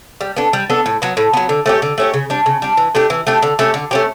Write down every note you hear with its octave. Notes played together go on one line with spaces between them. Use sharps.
G3
B3 D4 A4
G3
B3 D4 A4
A2
F#3 B3
A2
F#3 B3
D3
A3 C#4 G4
D3
A3 C#4 G4
C#3
G3 D4
C#3
G3 D4
E3
A3 D4 G4
E3
A3 D4 G4
D3
A3 C#4 G4
D3
A3 C#4 G4